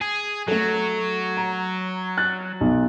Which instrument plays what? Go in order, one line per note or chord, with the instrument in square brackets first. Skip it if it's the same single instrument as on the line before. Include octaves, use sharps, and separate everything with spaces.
[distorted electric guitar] G#4
[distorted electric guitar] F#3 [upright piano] A3 A4
[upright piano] A#5
F#6 A6
B1